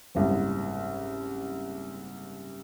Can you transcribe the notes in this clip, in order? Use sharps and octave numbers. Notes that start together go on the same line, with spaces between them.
F#1 C2 G#2